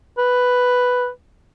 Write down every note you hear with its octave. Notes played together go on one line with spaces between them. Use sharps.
B4